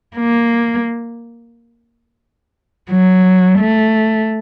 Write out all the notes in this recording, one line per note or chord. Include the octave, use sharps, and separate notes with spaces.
A#3
F#3
A3